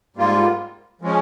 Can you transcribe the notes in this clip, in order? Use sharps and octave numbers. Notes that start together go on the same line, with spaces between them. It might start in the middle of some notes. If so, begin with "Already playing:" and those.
G#2 G3 A#3 F4
F3 G#3 C#4